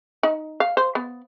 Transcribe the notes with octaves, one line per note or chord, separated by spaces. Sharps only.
D#4
F5
C5
B3